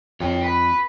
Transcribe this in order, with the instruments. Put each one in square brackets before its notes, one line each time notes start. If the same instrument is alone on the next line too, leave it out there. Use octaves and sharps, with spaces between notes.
[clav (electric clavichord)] F2 [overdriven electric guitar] C#5 G5
[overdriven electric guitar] B4 B5